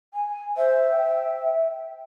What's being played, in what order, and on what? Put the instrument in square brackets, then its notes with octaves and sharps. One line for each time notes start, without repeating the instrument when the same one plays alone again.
[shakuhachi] G#5
[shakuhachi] C5 [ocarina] E5
[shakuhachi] G5